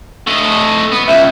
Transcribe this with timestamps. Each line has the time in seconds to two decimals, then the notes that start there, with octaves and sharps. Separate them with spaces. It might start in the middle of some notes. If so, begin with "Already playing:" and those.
0.27 A3 D#5
0.92 B3
1.08 C#2 E5